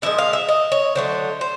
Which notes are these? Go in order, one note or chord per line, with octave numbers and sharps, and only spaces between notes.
A#2 F3 G#3 E5
F5
E5
D#5
C#5
D3 F#3 A3 C5
C5